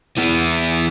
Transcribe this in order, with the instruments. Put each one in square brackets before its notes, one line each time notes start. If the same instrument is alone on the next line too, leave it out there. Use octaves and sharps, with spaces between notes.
[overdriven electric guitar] E3 B3